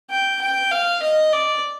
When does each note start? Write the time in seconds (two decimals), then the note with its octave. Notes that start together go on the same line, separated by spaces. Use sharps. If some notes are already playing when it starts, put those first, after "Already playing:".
0.10 G5
0.41 G5
0.71 F5
1.02 D#5
1.32 D5